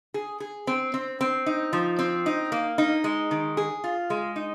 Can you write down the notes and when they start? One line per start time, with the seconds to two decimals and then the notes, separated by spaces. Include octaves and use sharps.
0.14 G#4
0.40 G#4
0.67 C4
0.94 C4
1.21 C4
1.46 D#4
1.73 F3
1.99 C4
2.26 D#4
2.52 A#3
2.78 D#4
3.04 G#3
3.31 D#3
3.57 G#4
3.84 F4
4.10 G#3
4.36 D#4